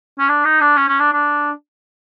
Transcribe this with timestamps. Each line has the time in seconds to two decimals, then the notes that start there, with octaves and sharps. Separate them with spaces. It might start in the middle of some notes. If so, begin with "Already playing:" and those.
0.19 C#4
0.29 D4
0.45 D#4
0.61 D4
0.76 C#4
0.88 C#4
0.99 D4
1.12 D4